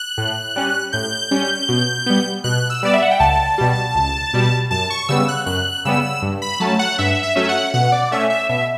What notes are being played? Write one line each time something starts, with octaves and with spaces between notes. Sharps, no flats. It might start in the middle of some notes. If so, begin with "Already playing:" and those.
Already playing: F#6
A2
G3 C#4
A2 G6
G3 C#4
B2
G3 B3
B2 F#6
E6
G3 B3 D5
E5
F#5
G5
C#2 A5
B2 G3
C#2
B2 G3
F#2 A5
C#6
C#3 G3 B3 E6
F#6
F#2 F#6
C#3 G3 B3 E6
G2
B5
F#3 A3 C#4 A5
F#5
G2 E5
E5
F#3 A3 C#4
F#5
B2 F#5
D5
A3 C#4 E5
E5
B2 E5